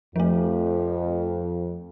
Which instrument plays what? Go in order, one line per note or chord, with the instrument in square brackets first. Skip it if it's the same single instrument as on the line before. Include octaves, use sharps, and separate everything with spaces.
[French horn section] F2 [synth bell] F3 A3